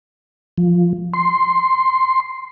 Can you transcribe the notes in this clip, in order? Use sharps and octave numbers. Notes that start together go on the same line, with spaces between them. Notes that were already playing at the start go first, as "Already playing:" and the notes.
F3
C6